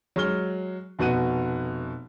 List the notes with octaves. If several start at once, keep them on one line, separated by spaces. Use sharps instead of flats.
F#3 G#3 C#6 F6 G7
F1 B2 F#4 F#5 D#7